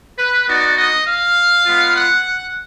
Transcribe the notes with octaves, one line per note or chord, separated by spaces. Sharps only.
B4
B3 D#4 F#4 D5
D#5
F5
G#3 B3 F4
F#5